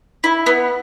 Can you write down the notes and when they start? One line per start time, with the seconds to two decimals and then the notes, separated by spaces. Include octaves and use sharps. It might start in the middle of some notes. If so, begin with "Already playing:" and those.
0.24 E4
0.46 B3